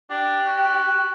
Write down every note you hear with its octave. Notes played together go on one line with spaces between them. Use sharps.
D4 G4
F#4